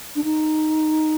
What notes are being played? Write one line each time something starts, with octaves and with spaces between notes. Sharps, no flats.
D4
D#4